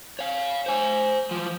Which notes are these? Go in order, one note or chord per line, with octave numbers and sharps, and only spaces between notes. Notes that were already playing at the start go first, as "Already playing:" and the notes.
C#5 F5
C5 G#5
E3 F3